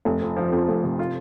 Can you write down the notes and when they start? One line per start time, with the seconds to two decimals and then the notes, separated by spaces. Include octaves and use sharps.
0.05 F1
0.21 F2
0.36 F3
0.52 F2
0.68 F1
0.83 C3
0.99 F4